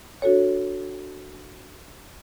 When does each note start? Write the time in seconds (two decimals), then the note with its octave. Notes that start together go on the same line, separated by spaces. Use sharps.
0.22 D4 F#4 A4 C#5